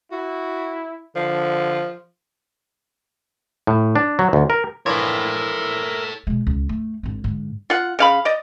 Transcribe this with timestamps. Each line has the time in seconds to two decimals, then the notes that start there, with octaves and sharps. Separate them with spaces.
0.12 E4 F#4
1.16 D3 F3
3.67 A2
3.96 D4
4.19 F#3
4.33 D2
4.50 A#4
4.86 E3 F3 D4 A4 A#4 C#5 E5
6.27 B2 G#3
6.47 C#2
6.69 A3
7.03 G#1 D4
7.24 G#2 D3
7.70 F4 F#5
7.99 C#3 F5 B5
8.25 D5 D#5